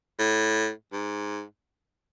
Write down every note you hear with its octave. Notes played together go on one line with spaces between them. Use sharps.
A2
G#2